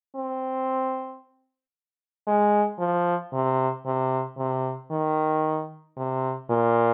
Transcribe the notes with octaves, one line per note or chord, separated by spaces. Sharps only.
C4
G#3
F3
C3
C3
C3
D#3
C3
A#2